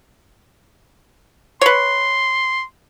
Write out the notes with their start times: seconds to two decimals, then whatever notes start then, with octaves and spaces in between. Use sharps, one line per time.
1.61 B4 C#5 C6